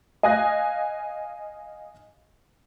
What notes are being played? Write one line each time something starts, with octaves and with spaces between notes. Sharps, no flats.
D#5 F5 G#5 D#6 F#6 A#6